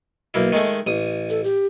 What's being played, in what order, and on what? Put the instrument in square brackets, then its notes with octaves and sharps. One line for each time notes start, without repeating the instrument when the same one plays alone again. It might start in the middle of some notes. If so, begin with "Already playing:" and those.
[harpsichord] B1 A#3 E4
D#3 G#3 A3
A1 D#6
[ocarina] A4
G4